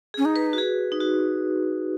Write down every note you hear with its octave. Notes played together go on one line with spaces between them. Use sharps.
G#4
C#4
D#4
B4
F#4
G#4
D#4
F#4